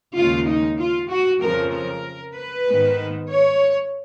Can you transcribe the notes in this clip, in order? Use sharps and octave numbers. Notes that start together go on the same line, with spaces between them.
D#2 C#3 G#3 F4
D#4
F4
F#4
F2 C#3 F3 A#4
A#4
B4
G#2 D#3 G#3 B3
C#5